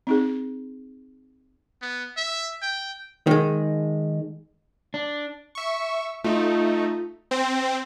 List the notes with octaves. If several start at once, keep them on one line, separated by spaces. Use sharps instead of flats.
C4 D#4 G#4
B3
E5
G5
D#3 G#3
D4
E5 C#6
A3 D#4 F4
C4